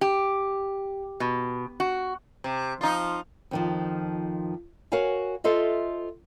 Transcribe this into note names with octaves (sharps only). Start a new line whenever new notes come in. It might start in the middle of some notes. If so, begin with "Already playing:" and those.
G4
B2
F#4
C3
F3 D#4 F4
F2 D#3 F3
F#4 A#4 C#5 F5 G#5
F4 A4 C5 D#5 E5